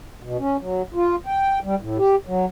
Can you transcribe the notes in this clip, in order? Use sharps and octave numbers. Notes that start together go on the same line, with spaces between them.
B2
C#4
F#3
F4
G5
G3
A2
G4
F#3